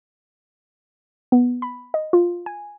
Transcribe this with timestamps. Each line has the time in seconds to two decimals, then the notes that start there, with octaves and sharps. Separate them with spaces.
1.32 B3
1.62 B5
1.94 D#5
2.13 F4
2.46 G#5